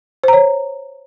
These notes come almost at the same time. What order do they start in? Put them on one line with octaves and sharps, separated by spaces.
C5 A#5 C#5